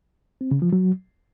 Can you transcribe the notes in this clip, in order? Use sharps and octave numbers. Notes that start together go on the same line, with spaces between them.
C4
C#3
F3
F#3